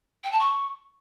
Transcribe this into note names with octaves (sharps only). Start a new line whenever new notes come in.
G5
A5
C#6